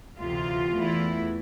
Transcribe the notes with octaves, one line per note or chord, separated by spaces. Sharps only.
D2 C3 E3 F4
E2 E3 A3 E4